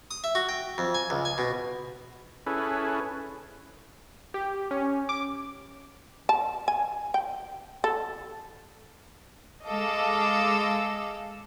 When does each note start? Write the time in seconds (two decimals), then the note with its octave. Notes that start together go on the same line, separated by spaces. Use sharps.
0.11 D#6
0.24 E5
0.35 F#4
0.49 G5
0.78 F2
0.95 G#5
1.10 C#2
1.25 G#5
1.38 B2
2.46 C#4 E4 G#4 A4 B4
4.34 G4
4.71 C#4
5.09 D6
6.29 A5
6.68 G#5
7.14 G5
7.84 A4
9.67 G#3 A4 D#5 F5 D6 E6